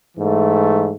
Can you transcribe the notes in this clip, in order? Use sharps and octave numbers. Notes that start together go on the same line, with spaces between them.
G#2 E3 A3